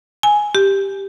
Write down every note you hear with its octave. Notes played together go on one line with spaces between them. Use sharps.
G#5
G4